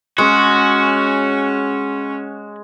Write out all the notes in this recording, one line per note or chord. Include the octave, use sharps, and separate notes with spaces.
G#3 C#4 F#4 C#5